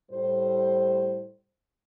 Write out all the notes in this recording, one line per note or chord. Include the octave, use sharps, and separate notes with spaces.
A2 G3 C5